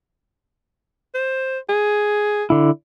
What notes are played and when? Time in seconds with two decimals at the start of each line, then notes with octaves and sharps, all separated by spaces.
1.14 C5
1.69 G#4
2.50 D3 E4